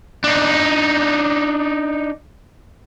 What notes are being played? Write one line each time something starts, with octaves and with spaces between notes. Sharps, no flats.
D4 D#4